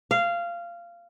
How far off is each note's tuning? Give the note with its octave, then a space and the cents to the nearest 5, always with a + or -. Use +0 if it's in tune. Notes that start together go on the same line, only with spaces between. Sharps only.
F5 -15